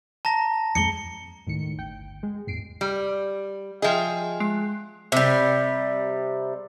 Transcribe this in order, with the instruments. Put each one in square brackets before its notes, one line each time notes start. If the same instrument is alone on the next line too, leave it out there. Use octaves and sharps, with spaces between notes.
[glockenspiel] A5 A#5 A#6
[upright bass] F2 G#3 [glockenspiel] C#7 G7
[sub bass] C#2 [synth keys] A2 D#3 C#7
[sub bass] G1 [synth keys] G5
[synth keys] G#3
[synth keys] A1 C7 D7 [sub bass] E2
[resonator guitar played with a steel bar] G3
[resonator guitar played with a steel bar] F3 G#4 [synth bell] D#5 E5 G5
[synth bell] G#3 C7
[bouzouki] C3 G3